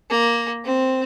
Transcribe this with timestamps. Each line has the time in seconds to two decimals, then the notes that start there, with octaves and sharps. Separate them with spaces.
0.10 A#3
0.64 C4